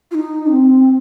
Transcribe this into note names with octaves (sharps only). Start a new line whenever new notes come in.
F4
D#4
C4